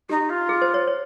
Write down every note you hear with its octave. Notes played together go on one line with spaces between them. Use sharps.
D#4 G4
F4
G#4
C5
C#5
C#5